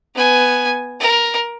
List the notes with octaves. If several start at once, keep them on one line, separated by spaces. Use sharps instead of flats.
B3 G#5
A#4